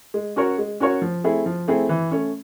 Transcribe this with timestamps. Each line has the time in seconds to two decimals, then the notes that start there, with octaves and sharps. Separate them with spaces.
0.14 G#3
0.36 C#4 F#4 A#4 C#5
0.58 G#3
0.80 C#4 F#4 A#4 C#5
1.02 F3
1.24 A3 C4 E4 G#4
1.46 F3
1.68 A3 C4 E4 G#4
1.89 E3
2.11 A3 C#4